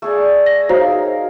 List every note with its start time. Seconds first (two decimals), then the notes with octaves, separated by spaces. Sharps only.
0.02 A3 G#4 D5
0.46 A#6
0.69 D#4 F#4 A#4 C5 C#5 F5